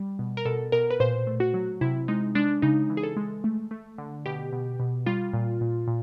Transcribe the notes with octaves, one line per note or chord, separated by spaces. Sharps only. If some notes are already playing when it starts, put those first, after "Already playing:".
Already playing: G3
B2
A#4
B2 A4
B2 A#4
B4
A#2 C5
A3
F#4
F#3
C3 E4
G#3 D#4
G#3 D4
C#3 D#4
E3
G#4
A4
G#3
A3
A3
D3
B2 G4
B2
B2
G3 F4
A#2
A#2
A#2